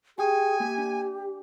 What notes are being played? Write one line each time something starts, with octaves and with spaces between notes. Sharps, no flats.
G4 G#4 G5 G#5 D#6
A#3 G4
D4